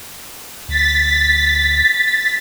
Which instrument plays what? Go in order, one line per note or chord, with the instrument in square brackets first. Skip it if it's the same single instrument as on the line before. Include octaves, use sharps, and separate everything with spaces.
[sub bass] D2 [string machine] A6 B6